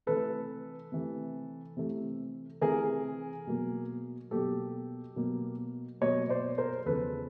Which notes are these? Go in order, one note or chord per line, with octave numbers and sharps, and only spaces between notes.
C3 E3 A3 A4 B4
C3 E3 A3
C3 E3 A3
C3 E3 A3 G#4 A#4
B2 F#3 A#3
B2 F#3 A#3 G4 A4
B2 F#3 A#3
B2 F#3 A#3 C#5 D#5
C5 D5
A#4 C5
E2 C#3 F3 A4 B4